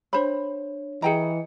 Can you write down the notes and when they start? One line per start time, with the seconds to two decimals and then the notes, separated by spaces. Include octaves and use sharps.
0.13 D4 C5 C#5 B5
1.02 E3 G#4 D#5 G5 A#5 C#7